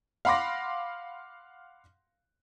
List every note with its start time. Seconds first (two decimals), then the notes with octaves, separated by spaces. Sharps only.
0.25 F5 F#5 B5 C6 D6 A#6